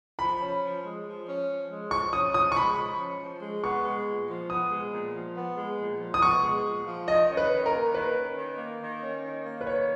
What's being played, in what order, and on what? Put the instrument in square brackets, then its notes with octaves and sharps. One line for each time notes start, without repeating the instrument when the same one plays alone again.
[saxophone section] F3 [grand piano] B5
[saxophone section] C#4
F3
G#3
F3
C#4
F3
G#3
[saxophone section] F3 [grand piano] C#6
[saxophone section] C#4 [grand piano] D#6
[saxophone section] F3 [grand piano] D#6
[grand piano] C#6
[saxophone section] G#3 [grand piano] B5
[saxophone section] F3
C#4
F3
G#3
[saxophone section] B3 [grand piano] C#6
[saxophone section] G#3
A#2
F3
[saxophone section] B3 [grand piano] D#6
[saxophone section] G#3
A#2
F3
B3
G#3
A#2
F3
[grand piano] D#6
[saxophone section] B3 [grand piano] C#6
[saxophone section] G#3
A#2
F3
[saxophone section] D#3 [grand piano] D#5
[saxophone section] C#4
[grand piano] B4
[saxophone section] D#3
[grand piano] A#4
[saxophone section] A#3
[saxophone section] D#3 [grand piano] B4
[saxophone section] C#4
D#3
A#3
D#3
C#4
D#3
A#3
[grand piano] B4
[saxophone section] D#3 [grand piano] C#5